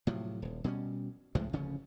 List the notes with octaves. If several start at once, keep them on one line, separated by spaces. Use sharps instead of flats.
A2 C3 F3 F#3
D#1
B2 G3 A#3 C#4
C#2 A2 F3 G#3
D1 C#3 F3 C#4